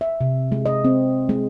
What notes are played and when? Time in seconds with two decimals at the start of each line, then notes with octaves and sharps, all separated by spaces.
0.01 E5
0.21 C3
0.52 G#3
0.66 D#5
0.85 C4
1.29 G#3